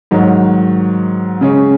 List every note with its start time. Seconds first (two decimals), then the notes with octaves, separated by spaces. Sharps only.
0.11 G#2 D#3 F#3
1.41 C#3 G#3 C#4 G#4